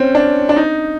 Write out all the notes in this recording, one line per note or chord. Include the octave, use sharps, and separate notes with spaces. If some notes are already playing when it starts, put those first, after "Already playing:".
Already playing: C4 C#4
D4
D4
D#4